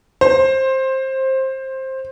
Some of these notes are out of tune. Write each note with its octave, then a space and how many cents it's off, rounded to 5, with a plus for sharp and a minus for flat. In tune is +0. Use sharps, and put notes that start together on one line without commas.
C5 +15